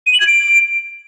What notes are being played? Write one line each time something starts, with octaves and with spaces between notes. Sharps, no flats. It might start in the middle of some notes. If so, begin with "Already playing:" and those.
D#7
F#7
G#6
D7